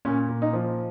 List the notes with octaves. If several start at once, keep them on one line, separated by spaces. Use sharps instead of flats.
A#2 C#4
A#2
D#4
F3